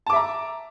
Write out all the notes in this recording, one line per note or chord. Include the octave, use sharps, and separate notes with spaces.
E5 A5 A#5 D6